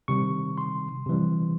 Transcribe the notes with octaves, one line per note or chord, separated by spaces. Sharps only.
C3 D#3 G3 C#6
C6
C3 E3 G3